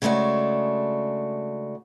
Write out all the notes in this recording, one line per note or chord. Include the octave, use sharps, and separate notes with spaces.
C#3 G#3 A3 D4 F#4